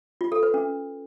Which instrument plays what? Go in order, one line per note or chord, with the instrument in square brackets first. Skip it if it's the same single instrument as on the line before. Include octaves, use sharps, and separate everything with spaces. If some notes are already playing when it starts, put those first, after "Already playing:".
[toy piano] F4
A4
B4
C#4